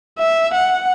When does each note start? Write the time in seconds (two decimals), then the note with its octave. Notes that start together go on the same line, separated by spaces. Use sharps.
0.19 E5
0.54 F#5